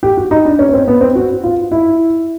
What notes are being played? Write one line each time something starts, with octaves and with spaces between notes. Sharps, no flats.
G4
F#4
D#4
D4
C#4
C#4
C4
B3
C4
F#4
F4
E4